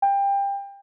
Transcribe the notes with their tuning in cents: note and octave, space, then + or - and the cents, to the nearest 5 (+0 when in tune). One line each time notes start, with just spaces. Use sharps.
G5 +25